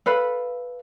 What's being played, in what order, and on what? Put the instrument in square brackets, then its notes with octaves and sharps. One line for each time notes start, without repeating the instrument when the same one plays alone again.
[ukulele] A4 B4 F5 B5